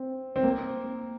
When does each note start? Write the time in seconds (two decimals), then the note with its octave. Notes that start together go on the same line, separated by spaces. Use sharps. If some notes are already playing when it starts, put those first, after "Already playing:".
Already playing: C4
0.36 C4
0.43 A#3